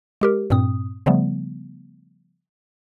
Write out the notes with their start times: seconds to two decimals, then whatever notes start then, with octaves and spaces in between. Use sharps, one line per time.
0.21 G#3 G4 A#4
0.50 G2 A#2 C4 D#6
1.06 C#3 F3 G3 A3 B3